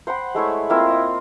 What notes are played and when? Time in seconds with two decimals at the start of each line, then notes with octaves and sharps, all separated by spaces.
0.07 C5 F#5 G5 B5
0.35 G#3 A3 E4 C#5
0.70 A#3 C4 E4 F4
0.89 D#5